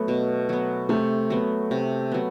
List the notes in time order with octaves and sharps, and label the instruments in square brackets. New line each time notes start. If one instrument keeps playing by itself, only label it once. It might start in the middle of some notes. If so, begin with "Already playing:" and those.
Already playing: [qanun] F#3 B3 [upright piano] A3
[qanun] B2
F#3 B3
[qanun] C3 [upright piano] A3
[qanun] F#3 B3
C3
F#3 B3